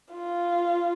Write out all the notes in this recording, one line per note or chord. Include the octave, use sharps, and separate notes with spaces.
F4